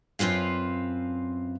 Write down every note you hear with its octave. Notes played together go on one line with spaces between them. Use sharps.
F#2 C4 F4 B4 F5